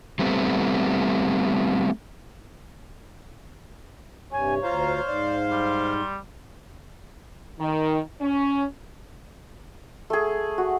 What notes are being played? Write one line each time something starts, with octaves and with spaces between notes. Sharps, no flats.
G3 A3 B3 C4
G2 C3 C#5 G#5
D2 F4 C5 F5 A#5
G#2 D5
G3 C6
D#3
C#4
A3 G#4
F#4